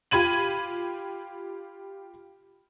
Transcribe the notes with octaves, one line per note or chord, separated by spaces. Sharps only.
F4 G4 B5 G#6 D#7 F#7